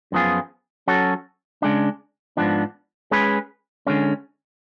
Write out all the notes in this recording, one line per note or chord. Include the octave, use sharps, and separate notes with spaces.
F#2 F3 B3 F4 G#4
F#3 C#4 F#4 A4
C#3 G#3 D4
G#2 F3 B3 D4
G#3 C#4 G#4 B4
D3 G#3 C#4